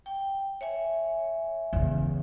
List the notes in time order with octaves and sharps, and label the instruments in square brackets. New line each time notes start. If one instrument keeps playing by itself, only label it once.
[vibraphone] G5
C#5 E5 G#5
[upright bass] E2 C#3